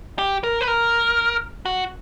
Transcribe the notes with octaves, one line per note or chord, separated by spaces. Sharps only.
G4
A#4
B4
A#4
F#4